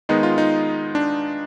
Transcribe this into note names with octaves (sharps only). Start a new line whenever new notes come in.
D#3 G#3 B3 D#4
F4
D#4
D4